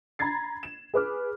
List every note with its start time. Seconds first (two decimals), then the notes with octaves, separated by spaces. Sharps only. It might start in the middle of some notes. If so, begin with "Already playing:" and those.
0.19 A#5 B5 G#6 A6 C7
0.63 E7
0.94 G#4 B4 D6 F6